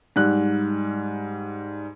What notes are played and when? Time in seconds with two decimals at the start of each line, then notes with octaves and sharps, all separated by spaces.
0.16 G#2 G3 F#6